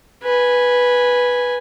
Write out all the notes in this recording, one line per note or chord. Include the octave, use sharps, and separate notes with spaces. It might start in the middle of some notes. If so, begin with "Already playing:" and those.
B4 G#5